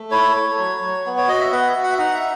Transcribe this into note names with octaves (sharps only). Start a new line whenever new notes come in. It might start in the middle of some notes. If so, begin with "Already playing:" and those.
Already playing: A3
E4 C#5
A3
F#3
F#3
B3
C#5
F#4 D#5
E5
B3 F#5
E5
F#4
F#5
E5
D#4 F#5
E5